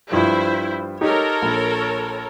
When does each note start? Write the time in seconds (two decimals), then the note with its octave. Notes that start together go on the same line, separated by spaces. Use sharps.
0.12 G2 F3 E4 C5
1.01 D#4 G4 A4 A#4 C#5
1.42 A#1